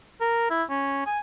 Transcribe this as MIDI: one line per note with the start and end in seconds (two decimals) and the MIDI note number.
0.21 0.47 70
0.50 0.63 64
0.70 1.03 61
1.06 1.20 80